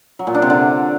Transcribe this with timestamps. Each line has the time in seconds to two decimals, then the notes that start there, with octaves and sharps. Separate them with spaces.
0.19 F#3
0.27 A#2
0.34 D4
0.42 C3
0.50 D3